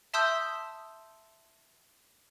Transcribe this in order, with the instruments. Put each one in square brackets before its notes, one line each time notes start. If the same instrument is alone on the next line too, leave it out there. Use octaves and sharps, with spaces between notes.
[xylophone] E5 A5 C6 D#6 E6 G6